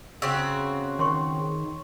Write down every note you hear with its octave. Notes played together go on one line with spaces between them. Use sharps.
C#3 C4 F#4 E6
D#3 C#5 C6 C#6